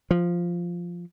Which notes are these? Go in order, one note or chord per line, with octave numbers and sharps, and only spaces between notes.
F3